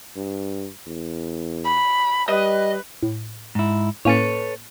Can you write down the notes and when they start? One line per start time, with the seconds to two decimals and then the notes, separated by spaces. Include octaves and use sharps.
0.16 G2
0.87 E2
1.64 B5
2.29 G3 B4 D#5
3.03 A2
3.55 G#2 E4
4.05 A2 A#3 C#4 A4 B4 C#5